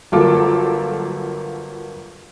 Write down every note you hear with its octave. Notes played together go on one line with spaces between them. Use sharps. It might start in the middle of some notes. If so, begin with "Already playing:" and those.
G1 F#3 A#3 F4 A4 D6